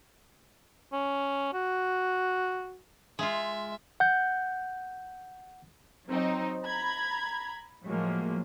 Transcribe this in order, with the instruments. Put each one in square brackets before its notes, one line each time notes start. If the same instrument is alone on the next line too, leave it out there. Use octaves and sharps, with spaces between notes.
[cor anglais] C#4
F#4
[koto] G#3 F4 [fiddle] E5
[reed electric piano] F#5 G6
[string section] F#3 C4 D#4
A#5 B5 G#6
A2 F3 F#3 G#3 A#3